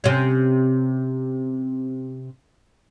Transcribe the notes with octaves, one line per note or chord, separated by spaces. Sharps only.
C3 C#4